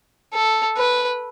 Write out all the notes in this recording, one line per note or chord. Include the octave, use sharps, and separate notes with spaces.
A4
B4